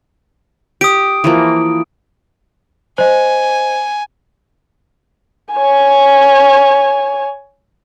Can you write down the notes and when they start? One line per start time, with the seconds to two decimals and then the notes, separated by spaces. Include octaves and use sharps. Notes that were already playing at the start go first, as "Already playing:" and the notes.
0.81 G4 D#6 D7
1.24 E3 F3 A#3
2.98 C5 D#5 G#5
5.54 C#5 G#5